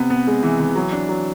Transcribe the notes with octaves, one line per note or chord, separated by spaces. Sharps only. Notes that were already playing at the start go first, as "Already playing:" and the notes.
Already playing: C3 B3
B3
G#3
E3
E3
F#3
D4
F#3